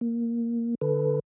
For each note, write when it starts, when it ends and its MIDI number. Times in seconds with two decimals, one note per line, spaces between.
0.01 0.75 58
0.81 1.19 50
0.81 1.19 69
0.81 1.19 71